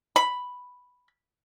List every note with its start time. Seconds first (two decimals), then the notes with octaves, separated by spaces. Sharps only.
0.16 B5